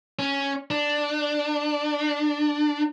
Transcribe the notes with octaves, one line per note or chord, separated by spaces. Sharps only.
C#4
D4